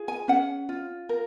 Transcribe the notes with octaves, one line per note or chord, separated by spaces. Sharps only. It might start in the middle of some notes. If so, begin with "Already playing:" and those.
Already playing: F4 G#4
G#5
C#4 F#5
F4
A#4